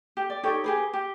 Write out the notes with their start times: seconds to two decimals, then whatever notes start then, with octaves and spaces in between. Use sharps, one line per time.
0.17 G4
0.30 D5
0.43 D#4 G4 A4 C#5
0.64 G4 G#4 B4
0.93 G4